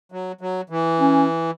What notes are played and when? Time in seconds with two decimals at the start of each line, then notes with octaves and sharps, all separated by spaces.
0.12 F#3
0.41 F#3
0.70 E3
0.99 C#4